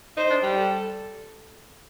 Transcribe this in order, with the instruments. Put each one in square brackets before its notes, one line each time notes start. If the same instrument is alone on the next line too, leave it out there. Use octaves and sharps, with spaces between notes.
[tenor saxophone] D#4 [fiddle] C5
[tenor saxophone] D4
G3
[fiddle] A4